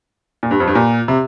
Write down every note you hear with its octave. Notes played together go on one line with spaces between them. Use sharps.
A#2
G2
F2
G2
A#2
C3